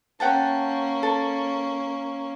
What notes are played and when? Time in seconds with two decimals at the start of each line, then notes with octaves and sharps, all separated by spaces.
0.20 A#3 C#4 F#5 G5 A5
1.03 A4